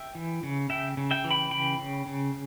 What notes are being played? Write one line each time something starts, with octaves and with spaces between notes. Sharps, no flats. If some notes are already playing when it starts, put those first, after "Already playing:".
Already playing: E5 G5
E3
C#3
C#3 E5 G5
C#3
E5 G5
E3
G5 B5
C#3 G5 B5
C#3
C#3